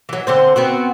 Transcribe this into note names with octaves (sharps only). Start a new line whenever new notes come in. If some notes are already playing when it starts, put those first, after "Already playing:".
E3 F#3
D3 C4 C5
B3 C4 F#4